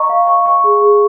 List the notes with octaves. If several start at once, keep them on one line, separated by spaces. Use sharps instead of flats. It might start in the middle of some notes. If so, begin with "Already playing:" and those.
Already playing: D#5 A#5 C#6
F5
C#6
C#6
G#4
G#4